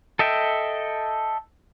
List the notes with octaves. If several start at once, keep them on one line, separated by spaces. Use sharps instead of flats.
A4 D#5 E5 G5